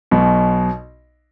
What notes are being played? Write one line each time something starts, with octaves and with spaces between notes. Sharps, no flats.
B1 B2